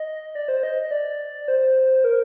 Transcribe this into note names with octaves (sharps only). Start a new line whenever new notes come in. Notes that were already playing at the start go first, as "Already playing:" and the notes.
Already playing: D#5
D5
C5
D#5
D#5
D5
C5
A#4